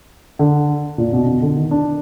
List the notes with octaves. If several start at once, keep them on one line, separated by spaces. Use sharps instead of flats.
D3
A#2
B2
B2
D3
D#3
D4